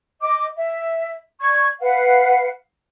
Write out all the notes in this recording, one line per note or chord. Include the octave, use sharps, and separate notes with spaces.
D#5 D6
E5
D5 C#6 G#6
B4 F5 F#5